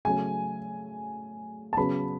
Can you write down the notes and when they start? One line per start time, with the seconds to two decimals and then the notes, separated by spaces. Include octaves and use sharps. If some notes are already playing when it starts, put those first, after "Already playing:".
0.05 C#3 F#3 A3 G#5
1.73 A5
1.77 C#3 F#3 B3 B5